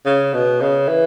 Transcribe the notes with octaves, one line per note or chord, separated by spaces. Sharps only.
C#3
B2
C#3
E3